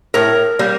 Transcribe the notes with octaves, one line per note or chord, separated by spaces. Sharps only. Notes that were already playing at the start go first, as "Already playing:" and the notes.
A2 A#4
G3 A#3